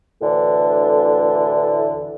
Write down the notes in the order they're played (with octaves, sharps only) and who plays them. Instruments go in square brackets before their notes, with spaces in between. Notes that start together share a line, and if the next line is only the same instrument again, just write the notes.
[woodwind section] D2 A2 D3 E3